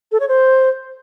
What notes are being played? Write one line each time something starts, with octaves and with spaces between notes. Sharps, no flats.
A4
C#5
C5